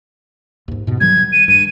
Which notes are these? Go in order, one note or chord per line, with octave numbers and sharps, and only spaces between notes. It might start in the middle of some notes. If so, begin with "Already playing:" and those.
D#2 G#2
G#2 B2
D#3 F#3 G3 G#6
D#7
G2 D#7